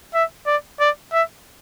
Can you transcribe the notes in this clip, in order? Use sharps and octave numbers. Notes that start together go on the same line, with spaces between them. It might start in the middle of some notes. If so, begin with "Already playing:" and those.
E5
D5
D5
E5